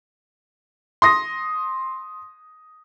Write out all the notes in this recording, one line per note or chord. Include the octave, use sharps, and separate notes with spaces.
C6 D#6 A#6